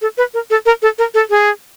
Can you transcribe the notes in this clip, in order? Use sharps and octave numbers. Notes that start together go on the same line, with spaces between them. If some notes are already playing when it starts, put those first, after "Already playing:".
A4
B4
A#4
A4
A#4
A4
A#4
A4
G#4